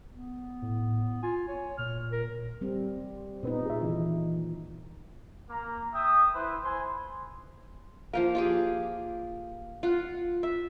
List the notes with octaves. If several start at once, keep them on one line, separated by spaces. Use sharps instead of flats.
B3
A2
F4 G#5
C#5
A#2 F6
A#4
G3 C4
A#2 B3 C4 D#4 B4
G#4 E5
D#3 E3
A#3 A#5
E5 G5 D#6
E4 B4 C5
C5 G#5 B5 C6
F3 A#3 A#4 F5
F4 G4 G#4
F4 F#5
E5